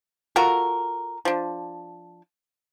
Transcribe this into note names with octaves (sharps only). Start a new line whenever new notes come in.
F4 F#4 A4 A#4
F3 D4